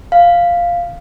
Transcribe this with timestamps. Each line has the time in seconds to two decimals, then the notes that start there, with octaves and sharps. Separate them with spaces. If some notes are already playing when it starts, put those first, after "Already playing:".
0.12 F5